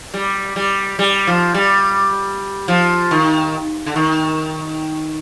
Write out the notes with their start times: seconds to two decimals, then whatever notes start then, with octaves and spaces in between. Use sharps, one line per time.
0.14 G3
0.56 G3
0.99 G3
1.27 F3
1.54 G3
2.68 F3
3.11 D#3
3.86 D3
3.96 D#3